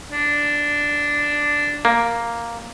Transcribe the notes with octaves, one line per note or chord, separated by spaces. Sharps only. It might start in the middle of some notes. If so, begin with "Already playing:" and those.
D4
A#3